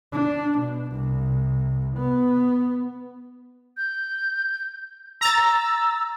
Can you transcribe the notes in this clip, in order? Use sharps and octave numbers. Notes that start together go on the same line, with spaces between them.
D4
B2
C2
B3
G6
A#5 E6 A6